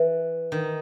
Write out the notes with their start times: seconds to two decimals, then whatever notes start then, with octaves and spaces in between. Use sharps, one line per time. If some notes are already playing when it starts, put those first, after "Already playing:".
Already playing: E3
0.52 D#3